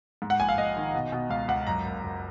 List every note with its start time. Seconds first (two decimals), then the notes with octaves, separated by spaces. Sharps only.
0.22 G#2
0.30 F#5
0.40 A#1 G#5
0.49 F5
0.57 A#1 D#5
0.77 D#3
0.94 B2
1.12 B2
1.30 C#2 F5
1.48 C#2 F#5
1.67 F#2 A#5
1.85 F#1
2.04 F#1